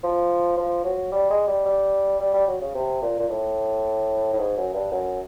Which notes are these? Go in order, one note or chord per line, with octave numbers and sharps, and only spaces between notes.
F3
F3
F#3
G3
G#3
G3
G3
G3
G3
F#3
C#3
C3
A#2
A#2
A2
A2
G#2
F#2
G2
F#2